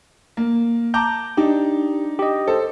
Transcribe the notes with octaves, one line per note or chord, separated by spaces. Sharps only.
A#3
A5 A#5 D6 G6
D4 D#4 G4
G4 D#5
A4 C5